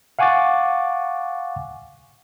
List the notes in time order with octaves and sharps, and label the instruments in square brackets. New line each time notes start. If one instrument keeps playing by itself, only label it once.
[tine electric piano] F5 F#5 G#5 C#6 D6 A6